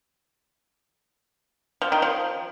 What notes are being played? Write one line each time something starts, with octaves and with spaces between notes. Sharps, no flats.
F3
D#3
F3